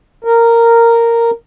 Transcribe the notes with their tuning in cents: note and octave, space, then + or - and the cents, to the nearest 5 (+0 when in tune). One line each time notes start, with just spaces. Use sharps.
A#4 -10